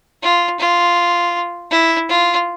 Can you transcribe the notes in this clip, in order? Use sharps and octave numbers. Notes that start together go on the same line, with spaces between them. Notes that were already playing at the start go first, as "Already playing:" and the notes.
F4
F4
E4
F4